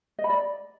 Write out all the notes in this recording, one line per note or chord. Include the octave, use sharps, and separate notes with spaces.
D#5
B5
D5